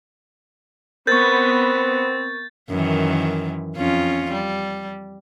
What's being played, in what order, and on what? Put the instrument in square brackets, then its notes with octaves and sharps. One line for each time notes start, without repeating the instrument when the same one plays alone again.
[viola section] B3 [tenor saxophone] C4 [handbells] A#4 C#6 [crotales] G6 A6
[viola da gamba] F#2 D#3 E3
F2 C#4 F4
G3